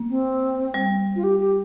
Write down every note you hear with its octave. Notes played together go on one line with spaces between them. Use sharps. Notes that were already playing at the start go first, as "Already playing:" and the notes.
Already playing: A#3
C4
G3
F4
G4
G4